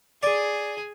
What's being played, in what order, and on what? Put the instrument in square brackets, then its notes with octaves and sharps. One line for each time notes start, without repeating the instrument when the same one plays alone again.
[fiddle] G#4 G#5 [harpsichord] D5